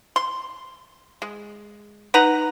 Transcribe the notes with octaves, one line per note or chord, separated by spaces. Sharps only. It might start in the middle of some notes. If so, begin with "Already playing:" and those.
C6
G#3
D#4 B4 F#5 A#5